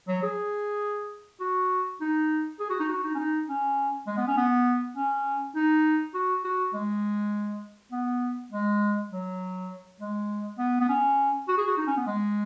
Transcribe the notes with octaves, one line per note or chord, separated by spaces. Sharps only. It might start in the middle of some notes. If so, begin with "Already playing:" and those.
F#3
G#4
F#4
D#4
G#4
F#4
D#4
F#4
D#4
C#4
D#4
C#4
G#3
B3
C#4
B3
C#4
D#4
F#4
F#4
G#3
B3
G#3
F#3
G#3
B3
B3
C#4
F#4
G#4
F#4
D#4
C#4
B3
G#3